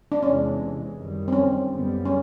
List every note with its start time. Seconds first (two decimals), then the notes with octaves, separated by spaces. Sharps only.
0.12 D4
0.23 E2 C3 E3 G#3 C#4
0.96 F#2 D#3 G3
1.28 C4
1.32 C#4
1.69 F#2 D3 G3 B3
2.05 C#4